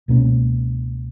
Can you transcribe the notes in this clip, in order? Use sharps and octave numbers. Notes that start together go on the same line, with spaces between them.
C#2 B2 A#3 C#4